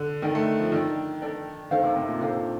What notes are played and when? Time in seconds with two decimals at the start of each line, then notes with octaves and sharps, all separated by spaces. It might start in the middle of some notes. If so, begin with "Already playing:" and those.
Already playing: D3
0.22 D#3 D4 A4 D5 G5
0.35 A3
0.60 F3
0.71 D#3 D4 A4 D5 G5
1.22 D4 A4 D5 G5
1.71 D#3 D4 A4 C5 F5
1.84 C3
1.96 C3
2.09 A#2
2.21 C3 D4 A4 C5 F5